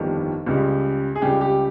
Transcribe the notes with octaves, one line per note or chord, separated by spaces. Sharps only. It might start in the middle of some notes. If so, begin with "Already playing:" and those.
Already playing: G1 F2 D#3 G3
C#2 C#3 G3
G#4
C#2 C#3 G3 G4
G4